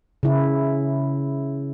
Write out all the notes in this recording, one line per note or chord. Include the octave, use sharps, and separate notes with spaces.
C#3 E4